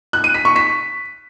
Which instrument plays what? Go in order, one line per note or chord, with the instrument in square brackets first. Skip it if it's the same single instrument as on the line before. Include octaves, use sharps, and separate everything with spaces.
[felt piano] F#6
D#7
B6
C#6
B6